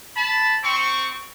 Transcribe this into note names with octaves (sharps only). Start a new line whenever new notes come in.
A5 B5
C4 C#6